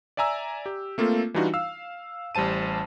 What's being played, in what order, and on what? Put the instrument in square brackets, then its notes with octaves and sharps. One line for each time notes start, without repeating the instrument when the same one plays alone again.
[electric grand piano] D5 E5 G#5 A#5 E6
G4
A3 A#3 C4 F4 A4
E3 G3 D4 D#4 F4 F#4
F5 E6
A1 G3 C5 A5 D#7